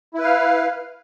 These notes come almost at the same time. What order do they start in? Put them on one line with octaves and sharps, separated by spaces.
E4 B4 F5